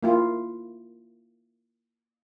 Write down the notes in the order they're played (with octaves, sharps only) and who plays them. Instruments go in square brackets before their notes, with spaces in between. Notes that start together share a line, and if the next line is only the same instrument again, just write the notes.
[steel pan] A#3 E4 F4